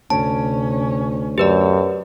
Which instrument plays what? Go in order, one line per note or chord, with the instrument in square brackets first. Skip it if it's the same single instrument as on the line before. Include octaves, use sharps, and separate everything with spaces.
[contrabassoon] D2 [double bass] C3 C#4 [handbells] A5
[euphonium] F#2 [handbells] G4 B4 D5